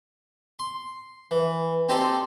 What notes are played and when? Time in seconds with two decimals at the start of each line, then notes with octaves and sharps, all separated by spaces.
0.59 C6
1.31 E3
1.89 C4 D#4 G4 A4 C5 D5